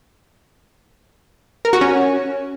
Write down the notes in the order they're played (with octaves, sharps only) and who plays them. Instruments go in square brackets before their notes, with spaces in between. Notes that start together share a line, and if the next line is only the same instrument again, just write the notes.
[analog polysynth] A#4
F#4
C#4